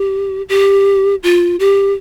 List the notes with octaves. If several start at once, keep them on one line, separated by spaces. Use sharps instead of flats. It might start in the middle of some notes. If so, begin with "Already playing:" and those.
Already playing: G4
G4
F4
G4